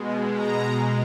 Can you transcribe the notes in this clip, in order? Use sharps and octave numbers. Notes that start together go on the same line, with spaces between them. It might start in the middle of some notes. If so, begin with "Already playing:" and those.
Already playing: B2 G#3
A#5